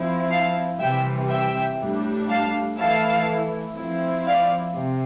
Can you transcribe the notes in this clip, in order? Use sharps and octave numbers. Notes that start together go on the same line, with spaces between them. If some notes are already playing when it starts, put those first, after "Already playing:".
Already playing: F3 C4 E4
F5 A5
C3 E3 G3 E5 G5
E5 G5
A2 G3 D4
F5 A5
E3 A3 E4 F5 A5
F3 C4 E4
D5 F5
C3